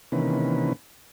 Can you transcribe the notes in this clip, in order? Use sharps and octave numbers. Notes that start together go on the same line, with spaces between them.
C3 D#3 E3 A#3 C#4 B4